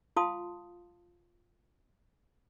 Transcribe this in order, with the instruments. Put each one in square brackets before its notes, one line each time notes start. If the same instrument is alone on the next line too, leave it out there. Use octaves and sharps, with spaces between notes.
[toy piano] F4 F5 A5 C6 D#6